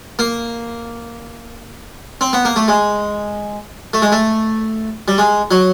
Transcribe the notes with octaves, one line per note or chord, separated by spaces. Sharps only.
A#3
C4
B3
A#3
A3
G#3
A3
G#3
A3
G3
G#3
F#3